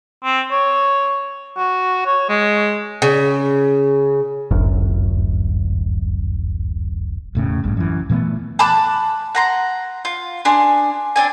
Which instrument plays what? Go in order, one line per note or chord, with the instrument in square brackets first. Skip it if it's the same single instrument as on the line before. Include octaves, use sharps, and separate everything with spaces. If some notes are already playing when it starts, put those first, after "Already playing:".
[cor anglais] C4
C#5
F#4
C#5
G#3
[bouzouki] C#3
[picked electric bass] D1 G1 F#2
[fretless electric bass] E1 A2 C#3
A1 G2
F#2 E3
A#2 E3 A3 B3
[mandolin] A5 B5 D6 F#6
F#5 A#5 C6
F4
D4 G#4 C6
C4 D4 G#5